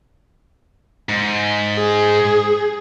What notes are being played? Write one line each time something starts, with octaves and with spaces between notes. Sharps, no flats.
G#2
G#4